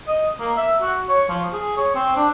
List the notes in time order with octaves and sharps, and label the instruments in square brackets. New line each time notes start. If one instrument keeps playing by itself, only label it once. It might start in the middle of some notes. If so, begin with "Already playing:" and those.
[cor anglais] D#5
A#3
E5
F#4
C#5
F3
G#4
C#5
C4
D4